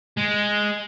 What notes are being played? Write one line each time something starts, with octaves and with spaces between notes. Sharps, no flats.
G#3